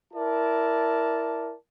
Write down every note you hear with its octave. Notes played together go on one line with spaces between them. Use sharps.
E4 A#4 D5 A5